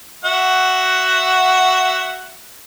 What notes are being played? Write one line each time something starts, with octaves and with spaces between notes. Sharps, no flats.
F#4 E5 F#5